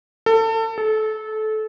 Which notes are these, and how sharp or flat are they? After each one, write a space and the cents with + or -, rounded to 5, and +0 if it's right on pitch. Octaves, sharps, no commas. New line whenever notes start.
A4 +30
A4 -20